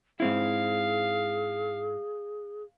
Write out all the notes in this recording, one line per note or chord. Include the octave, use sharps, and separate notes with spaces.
G#2 C4 E4 G#4 F5